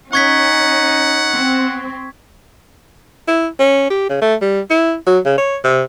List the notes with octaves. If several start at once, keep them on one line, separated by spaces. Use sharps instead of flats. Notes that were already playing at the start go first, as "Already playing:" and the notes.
C#4 D#4 F#5 C#6 G#6 B6
C4
E4
C#4
G4
C#3
A3
G3
E4
F#3
C#3
C#5
C3